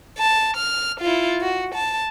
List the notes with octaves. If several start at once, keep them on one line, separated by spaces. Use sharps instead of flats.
A5
F6
E4 F4
F#4
A5